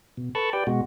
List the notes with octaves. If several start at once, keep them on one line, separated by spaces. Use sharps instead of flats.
B2
A4 B4 A5 B5 C#6
G4 B4 D5 G5
B2 G#3 F#4